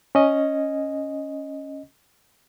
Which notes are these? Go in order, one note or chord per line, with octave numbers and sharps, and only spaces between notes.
C#4 D#5